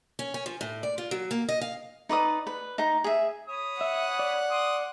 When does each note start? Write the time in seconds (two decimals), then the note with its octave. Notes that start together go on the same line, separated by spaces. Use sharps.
0.19 C#4
0.34 C#4
0.46 F3
0.61 A2
0.83 D5
0.98 F4
1.11 F#3
1.31 A#3
1.49 D#5
1.61 F5
2.09 D#4 B4 D5 D#6
2.47 B4
2.78 D#4 A#5
3.04 G#4 E5
3.48 C#5 B5 D#6
3.81 E5 F#5
4.19 D5
4.51 C6 D6 D#6